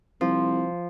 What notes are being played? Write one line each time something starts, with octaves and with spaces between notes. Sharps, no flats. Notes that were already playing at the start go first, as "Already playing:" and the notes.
C2 F3